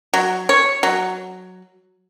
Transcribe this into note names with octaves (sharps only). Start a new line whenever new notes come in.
F#3
C#5
F#3